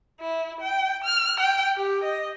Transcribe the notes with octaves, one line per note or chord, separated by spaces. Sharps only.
E4
G5
F6
G5
G4
D#5